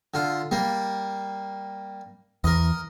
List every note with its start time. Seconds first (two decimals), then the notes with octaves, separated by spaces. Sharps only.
0.14 D3 F4
0.51 G3 A#3
2.44 E2 A#4 D#5